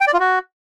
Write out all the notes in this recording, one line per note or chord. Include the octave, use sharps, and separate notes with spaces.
G5
D5
F4
F#4